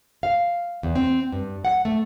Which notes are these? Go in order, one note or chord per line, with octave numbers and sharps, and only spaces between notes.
F5
E2
C4
G2
F#5
A3